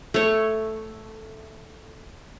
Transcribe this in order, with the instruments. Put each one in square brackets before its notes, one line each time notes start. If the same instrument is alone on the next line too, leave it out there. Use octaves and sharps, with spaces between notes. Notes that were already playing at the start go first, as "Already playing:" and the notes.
[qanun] A3 C#5